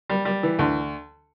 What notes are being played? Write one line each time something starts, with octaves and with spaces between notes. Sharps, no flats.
G3
G3
E3
D2